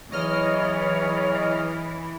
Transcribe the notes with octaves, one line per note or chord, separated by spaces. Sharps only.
E2 E3 F#3 C#5 D#5 F6